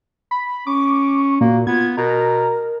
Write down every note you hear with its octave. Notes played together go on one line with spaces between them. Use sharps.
B5
C#4 C#6 D6
A#2 A#3 F#4
B3 F4 G#6
B2 A#4 A#5